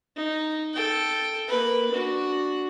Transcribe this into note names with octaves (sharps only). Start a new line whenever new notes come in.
D#4
A4 G5
A#3 B4
D4 F#4